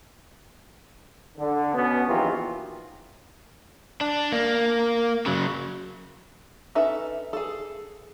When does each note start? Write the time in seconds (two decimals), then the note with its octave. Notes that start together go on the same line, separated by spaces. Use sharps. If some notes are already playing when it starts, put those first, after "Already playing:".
1.38 D3
1.75 B2 B3 C#4
2.08 A#1 D#3 E3 F#3 F4 G4
4.01 D4
4.32 A#3
5.26 C#3 F#3
6.75 C#4 D#4 A4 B4 E5
7.33 G#4 A4